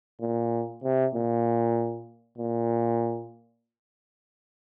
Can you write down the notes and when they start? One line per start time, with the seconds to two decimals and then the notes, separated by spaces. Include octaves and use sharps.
0.21 A#2
0.84 C3
1.15 A#2
2.38 A#2